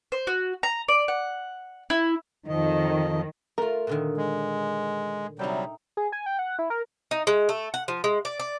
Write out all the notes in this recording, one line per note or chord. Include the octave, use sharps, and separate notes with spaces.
C5
F#4
A#5
D5
F#5
E4
F2 D#3 F3 D#5
A3 F4 A#4
A#2 D3 D#3
G#3
C3 F#3 G3 D#4 E5 G5
G#4
G#5
G5
F#5
E4
A#4
D#4
G#3
A3
F#5
F3
G#3
D5
D5